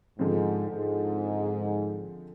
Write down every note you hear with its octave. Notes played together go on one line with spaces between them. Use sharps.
G#2 D3 F3 G#3 C4
G#2